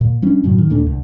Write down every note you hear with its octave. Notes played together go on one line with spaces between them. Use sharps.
A#2
G3 C#4 D4
F#2 A2 C#3 F#3
D#3
D#2 A#2 A3 D4
C2